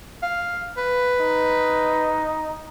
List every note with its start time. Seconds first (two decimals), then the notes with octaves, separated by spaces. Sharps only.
0.22 F5
0.77 B4
1.20 D#4